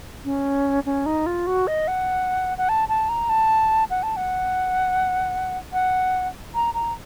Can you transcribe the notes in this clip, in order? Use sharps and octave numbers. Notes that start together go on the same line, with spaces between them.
C#4
C#4
D#4
F4
F#4
D#5
F#5
F#5
A5
A5
A#5
A5
F#5
A5
F#5
F#5
A#5
A#5